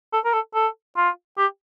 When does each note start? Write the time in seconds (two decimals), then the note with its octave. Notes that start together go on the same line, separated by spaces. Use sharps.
0.13 A4
0.25 A#4
0.33 A4
0.54 A4
0.97 F4
1.38 G4